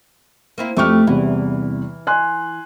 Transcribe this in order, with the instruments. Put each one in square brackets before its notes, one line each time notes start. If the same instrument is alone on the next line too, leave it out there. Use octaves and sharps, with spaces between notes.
[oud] A#3 C4 E4
[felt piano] F2 C#6 F6 [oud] A3 G4
[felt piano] E2 C3 G3 [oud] E3
[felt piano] G#5 C6 F#6